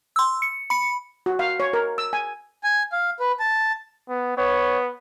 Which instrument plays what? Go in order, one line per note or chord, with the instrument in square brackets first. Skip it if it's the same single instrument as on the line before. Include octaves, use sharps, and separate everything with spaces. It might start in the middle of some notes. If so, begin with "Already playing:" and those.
[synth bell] C6 E6
C#7
B5 C#7
[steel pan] F#4
F5
C#5
A#4
E6
G#5
[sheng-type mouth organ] G#5
F5
B4
A5
[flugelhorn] B3
[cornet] B3 [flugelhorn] C#5